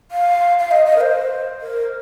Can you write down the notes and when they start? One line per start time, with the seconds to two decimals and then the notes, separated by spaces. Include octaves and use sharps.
0.11 F5
0.59 F5
0.71 D#5
0.86 D#5
0.96 A#4
1.01 C5
1.61 A#4